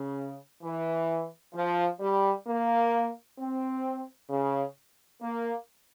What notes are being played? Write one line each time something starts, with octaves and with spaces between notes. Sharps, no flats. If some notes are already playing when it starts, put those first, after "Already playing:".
Already playing: C#3
E3
F3
G3
A#3
C4
C#3
A#3